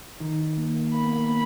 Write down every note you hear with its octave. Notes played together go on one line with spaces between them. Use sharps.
D#3 D#4
A#3
A#3
A#3 B5
B3
A#3